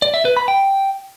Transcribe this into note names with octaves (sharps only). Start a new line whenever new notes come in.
D5
E5
B4
B5
G5